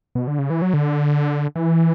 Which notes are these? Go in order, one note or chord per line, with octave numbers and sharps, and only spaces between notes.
B2
D3
C#3
E3
F#3
D3
E3